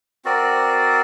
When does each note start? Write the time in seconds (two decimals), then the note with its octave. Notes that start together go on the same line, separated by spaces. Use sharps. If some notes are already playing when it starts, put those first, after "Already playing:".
0.25 C4 F#4 A#4 D5